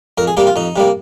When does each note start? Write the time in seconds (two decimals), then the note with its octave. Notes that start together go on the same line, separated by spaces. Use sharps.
0.18 F2 A#4
0.27 G#4
0.37 C3 G3 A#3 G4
0.47 F4
0.56 F2 D#4
0.76 C3 G3 A#3